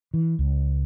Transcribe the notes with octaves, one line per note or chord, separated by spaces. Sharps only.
E3
C#2